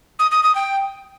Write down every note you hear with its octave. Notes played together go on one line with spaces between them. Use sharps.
D#6
D#6
D#6
G5